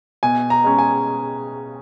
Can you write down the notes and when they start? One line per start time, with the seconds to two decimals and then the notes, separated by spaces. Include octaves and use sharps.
0.23 B2 G#5
0.50 A#5
0.64 G#3 C#4
0.78 G#5